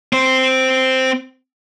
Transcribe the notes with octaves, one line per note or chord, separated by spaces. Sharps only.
C4 C5